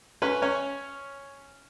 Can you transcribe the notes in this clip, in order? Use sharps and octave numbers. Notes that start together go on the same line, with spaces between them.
C#4 B4
C#4 C#5